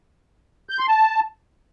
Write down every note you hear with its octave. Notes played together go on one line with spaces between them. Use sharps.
G6
C6
A5